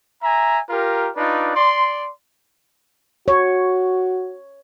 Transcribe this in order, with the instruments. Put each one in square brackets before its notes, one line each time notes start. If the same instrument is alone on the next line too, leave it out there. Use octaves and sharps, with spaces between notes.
[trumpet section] E5 G#5 A#5
F4 G4 A#4
D4 D#4 F4 B4 D5
D5 C6
[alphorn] F#4 [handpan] C#5